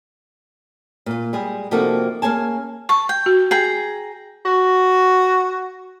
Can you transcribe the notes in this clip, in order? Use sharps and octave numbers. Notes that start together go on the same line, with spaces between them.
A#2 F4
G3 G#3 G#4
C3 F3 A#3 D#4 F#4 A4
A#3 C#4 G#4 G#5 A5
A5 C#6
G5
F#4
G#4 G5 A#5
F#4